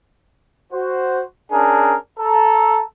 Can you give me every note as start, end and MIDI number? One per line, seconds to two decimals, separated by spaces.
0.73 1.22 66
0.73 1.22 72
1.52 1.95 61
1.52 1.95 62
1.52 1.95 68
1.52 1.95 70
2.19 2.82 69
2.19 2.82 82